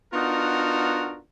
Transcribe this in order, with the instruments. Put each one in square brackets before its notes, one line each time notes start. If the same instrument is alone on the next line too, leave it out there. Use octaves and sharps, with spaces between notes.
[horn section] B3 D4 D#4 F4 F#4 A#4